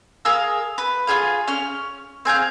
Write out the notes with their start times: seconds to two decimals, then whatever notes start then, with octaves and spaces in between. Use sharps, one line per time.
0.25 G#4 A#4 F5 E6
0.78 B4
1.07 F4 G4 G#4 F5
1.48 C#4 F6
2.25 C4 G#4 F5 G6